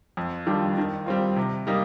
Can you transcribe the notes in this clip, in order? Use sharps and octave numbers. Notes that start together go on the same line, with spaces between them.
F2
D#3 G3 D4 F4
D#3
G3 C4 F4
C3
G3 A#3 D#4